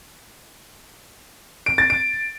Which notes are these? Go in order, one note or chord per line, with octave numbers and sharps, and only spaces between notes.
D7
A6
D7